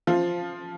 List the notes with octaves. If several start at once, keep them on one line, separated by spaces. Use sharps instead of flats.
F3 F4